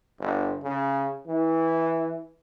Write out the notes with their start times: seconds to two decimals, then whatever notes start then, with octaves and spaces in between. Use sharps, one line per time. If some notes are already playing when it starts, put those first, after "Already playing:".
0.19 G1
0.63 C#3
1.27 E3